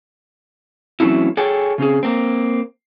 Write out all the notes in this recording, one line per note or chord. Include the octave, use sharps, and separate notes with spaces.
E3 F#3 A3 C4 C#4 E4
G#4 A4 C#5 G5 G#5
C#3 C4 C#4 G#4
A#3 C4